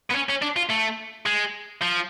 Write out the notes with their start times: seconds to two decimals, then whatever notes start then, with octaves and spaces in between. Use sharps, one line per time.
0.10 B3
0.15 C#4
0.29 C#4
0.42 D4
0.57 F4
0.70 A3
1.26 G#3
1.82 F3